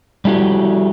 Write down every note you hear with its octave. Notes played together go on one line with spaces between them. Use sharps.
G3 A3 E4 F#4 G4